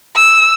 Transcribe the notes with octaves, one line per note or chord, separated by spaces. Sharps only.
E6